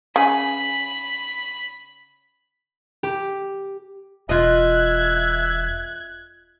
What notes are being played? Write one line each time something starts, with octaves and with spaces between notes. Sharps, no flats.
C#3 B4 G#5 B5
G4
E1 F4 D#5 E5 F#6 G#6